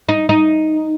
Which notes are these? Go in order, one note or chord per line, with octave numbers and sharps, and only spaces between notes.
D#4
D#4